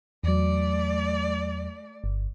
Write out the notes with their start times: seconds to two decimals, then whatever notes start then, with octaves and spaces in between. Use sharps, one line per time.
0.24 E2 F#3 A3 D5
2.04 G1